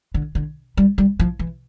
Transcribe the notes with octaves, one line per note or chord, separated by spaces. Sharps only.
D3
D3
G3
G3
F3
E3